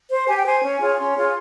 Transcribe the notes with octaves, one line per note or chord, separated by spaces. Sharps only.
C5
G4 G#5
G5
C5 G#5
C#4
F4 G#4 C#5
C#4 C6
F4 G#4 C#5